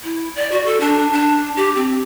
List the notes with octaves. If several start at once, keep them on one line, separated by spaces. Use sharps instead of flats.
E4
D5
F#4
A4
D4
D4
G4
C4